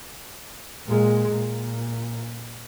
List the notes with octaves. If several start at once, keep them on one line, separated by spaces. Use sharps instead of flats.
A#2 G#3
A#2